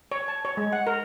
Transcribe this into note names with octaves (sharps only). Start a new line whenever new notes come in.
C#5
A5
C#5
G#3
F#5
A#4